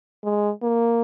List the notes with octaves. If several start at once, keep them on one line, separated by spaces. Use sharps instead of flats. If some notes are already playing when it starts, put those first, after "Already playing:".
G#3
A#3